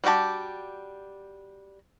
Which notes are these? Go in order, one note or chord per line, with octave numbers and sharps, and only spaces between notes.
G3 D4 F#4 G4 A5